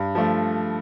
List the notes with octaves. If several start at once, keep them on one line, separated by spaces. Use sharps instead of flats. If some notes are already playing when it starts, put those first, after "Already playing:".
Already playing: G2
F3 A3